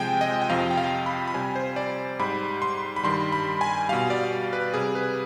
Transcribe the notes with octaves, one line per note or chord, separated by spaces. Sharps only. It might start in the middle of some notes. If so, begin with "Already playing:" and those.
Already playing: C3 F3 G#3 G5 G#5
D#5
G5
F2 C3 F3 F5
G5
F5
B5
B5
C3 G3 G#5
C5
D5
G#2 G3 B5
C6
B5
G2 D#3 G3 C6
B5
G#5
B2 G3 F5
D5
B4
C3 G3 G#4
B4